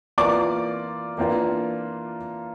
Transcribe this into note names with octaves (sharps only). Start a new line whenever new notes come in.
E3 A#3 F4 D5 D6
E3 A#3 D4 F4